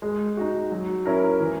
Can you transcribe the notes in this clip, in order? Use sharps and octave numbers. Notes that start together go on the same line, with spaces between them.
G#3
D#4 F#4
F#3
C#4 E4 A#4
E3